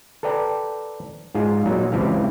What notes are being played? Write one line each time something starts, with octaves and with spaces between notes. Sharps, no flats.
A4 B4 D5 G5 A#5
G#2 G#3 F4
A#2 F#3 D#4
C#2 E3 C4 G4 F5